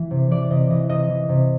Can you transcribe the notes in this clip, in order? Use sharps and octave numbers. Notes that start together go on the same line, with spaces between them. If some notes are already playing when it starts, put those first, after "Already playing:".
Already playing: E3
C3
E3 D5
C3 D#5
E3 D#5
C3 D#5
E3
C3